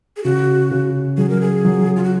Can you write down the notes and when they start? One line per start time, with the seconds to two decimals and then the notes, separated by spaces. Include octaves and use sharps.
0.17 G#4
0.24 C#3 F#4
0.71 C#3
1.17 F#3 G#4
1.29 A#4
1.41 G#4
1.65 F#3
1.96 F4
2.04 F#4